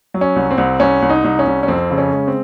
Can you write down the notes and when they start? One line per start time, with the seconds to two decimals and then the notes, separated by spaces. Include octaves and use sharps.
0.14 F#3
0.21 C#4
0.36 C2
0.51 C4
0.58 C2
0.80 C2 C#4
1.02 C2
1.10 D#4
1.24 C2
1.39 C#4
1.47 C2
1.63 C#4
1.68 F2 C4
1.91 C#3
1.98 C#4
2.13 G#3
2.28 C4